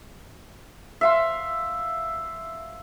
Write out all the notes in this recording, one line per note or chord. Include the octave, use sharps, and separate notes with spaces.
E5 F5 C6